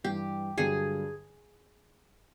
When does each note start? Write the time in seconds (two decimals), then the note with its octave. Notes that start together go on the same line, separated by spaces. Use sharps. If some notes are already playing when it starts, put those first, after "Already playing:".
0.04 G2 E3 G3 G4
0.58 G2 D3 F#3 G#4